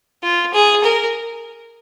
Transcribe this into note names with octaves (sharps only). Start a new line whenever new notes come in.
F4
G#4
A#4